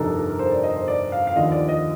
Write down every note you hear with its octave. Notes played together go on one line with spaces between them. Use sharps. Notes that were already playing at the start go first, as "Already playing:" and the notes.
Already playing: G1 F2 C3 D4 D#4 A4 A#4
A4
A#4
C5
D5
D#5
C5
D5
F5
F5
D#2 D3 F3 D#5
D5
D#5